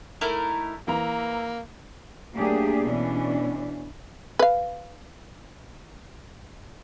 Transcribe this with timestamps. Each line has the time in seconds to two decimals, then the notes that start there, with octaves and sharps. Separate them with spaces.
0.21 A3 D#4 E4 A#4
0.88 E3 A#3 A#5
2.33 F#3 A3 A#3 D4 G4 G#4
2.82 B2 E3 C#4 D4
4.39 B4 F5